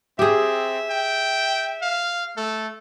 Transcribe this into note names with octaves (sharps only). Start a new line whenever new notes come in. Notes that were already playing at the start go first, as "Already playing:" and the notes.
C4 G4 G#4 E5
G5
F5
A3 A4